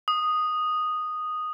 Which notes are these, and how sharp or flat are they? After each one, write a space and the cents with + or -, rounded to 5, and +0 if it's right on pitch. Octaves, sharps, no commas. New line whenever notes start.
D#6 -5